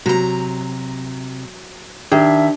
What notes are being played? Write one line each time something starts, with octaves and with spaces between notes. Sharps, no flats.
C3 F#3 A#5
D#3 D4 G4 E5